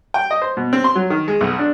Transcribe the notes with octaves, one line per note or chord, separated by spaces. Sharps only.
G5
D#5
C5
B2
C4
C6
F#3
D#3
G#3
B1
D4